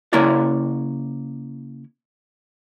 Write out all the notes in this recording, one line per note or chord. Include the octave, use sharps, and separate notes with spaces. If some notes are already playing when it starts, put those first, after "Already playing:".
C#3 A#3 E4 A#4 C#5 D5